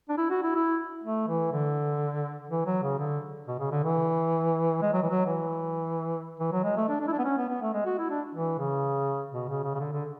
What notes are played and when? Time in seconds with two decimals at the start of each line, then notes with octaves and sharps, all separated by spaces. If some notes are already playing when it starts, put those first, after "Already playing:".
0.09 D4
0.18 E4
0.30 F#4
0.43 E4
0.55 E4
1.04 A3
1.28 E3
1.52 D3
2.50 E3
2.66 F#3
2.83 C#3
2.99 D3
3.48 B2
3.59 C#3
3.72 D3
3.84 E3
4.82 G#3
4.93 F#3
5.03 E3
5.10 F#3
5.26 E3
6.40 E3
6.52 F#3
6.64 G#3
6.77 A3
6.89 D4
7.00 D4
7.08 E4
7.12 D4
7.19 B3
7.25 C#4
7.38 B3
7.49 B3
7.61 A3
7.74 G#3
7.86 F#4
7.99 E4
8.10 D4
8.35 E3
8.59 C#3
9.33 B2
9.49 C#3
9.64 C#3
9.75 C#3
9.80 D3
9.93 D3